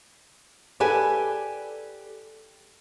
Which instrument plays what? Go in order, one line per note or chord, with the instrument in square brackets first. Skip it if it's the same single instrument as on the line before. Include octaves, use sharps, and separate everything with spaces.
[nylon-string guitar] G4 A4 B4 D5 G#5